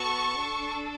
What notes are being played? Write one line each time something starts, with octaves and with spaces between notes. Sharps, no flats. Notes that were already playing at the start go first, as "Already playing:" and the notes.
Already playing: B3 F#4 A4 A5 C#6
D4 A4